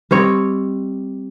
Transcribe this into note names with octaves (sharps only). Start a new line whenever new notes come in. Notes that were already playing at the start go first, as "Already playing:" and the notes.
G3 C4 C#5 D#5